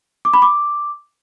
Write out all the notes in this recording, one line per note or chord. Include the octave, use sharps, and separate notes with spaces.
D6
B5
D6